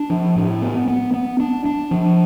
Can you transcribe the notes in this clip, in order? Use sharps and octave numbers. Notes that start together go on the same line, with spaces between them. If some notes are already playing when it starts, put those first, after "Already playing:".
Already playing: D4
F3
A2
B3
B3
B3
D4
D4
F3